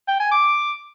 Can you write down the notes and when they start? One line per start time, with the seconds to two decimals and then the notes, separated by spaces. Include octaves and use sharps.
0.08 G5
0.20 G#5
0.32 D6